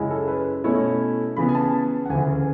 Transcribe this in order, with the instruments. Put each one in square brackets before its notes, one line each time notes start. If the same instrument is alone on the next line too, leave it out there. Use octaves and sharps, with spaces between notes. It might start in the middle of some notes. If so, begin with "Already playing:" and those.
Already playing: [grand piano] F#2 C#3 G#3 C#4 E4
A4
B4
B2 A3 C#4 E4 C#5
C#3 E3 B3 B5
G#5
A5
F#5
D2 C#3 E3 G#5